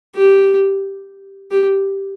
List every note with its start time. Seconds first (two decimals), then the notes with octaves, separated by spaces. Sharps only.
0.15 G4
1.51 G4